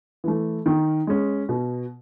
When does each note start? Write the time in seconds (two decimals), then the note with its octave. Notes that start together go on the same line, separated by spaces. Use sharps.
0.24 E3 A3
0.66 D#3
1.07 G#3 C#4
1.49 B2